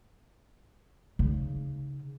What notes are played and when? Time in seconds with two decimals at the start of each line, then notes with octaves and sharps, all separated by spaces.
1.19 C#3 D#4